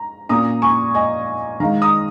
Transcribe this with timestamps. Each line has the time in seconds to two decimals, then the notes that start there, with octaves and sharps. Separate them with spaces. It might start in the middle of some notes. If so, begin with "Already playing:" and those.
Already playing: A#5
0.29 A#2 A#3 C#4 A#5 D#6
0.62 G#5 C#6
0.95 D#5 G#5
1.60 D#3 G#3 D#4 F5 A#5
1.82 A#5 D#6